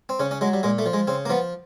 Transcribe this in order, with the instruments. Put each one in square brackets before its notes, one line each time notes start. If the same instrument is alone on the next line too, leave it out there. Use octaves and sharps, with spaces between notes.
[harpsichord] C4
C#3 C#4
C#4
F#3 G#3
G3
A#2 G#3
A3
F3
G#3
C#3 C4
A#3
F3 B3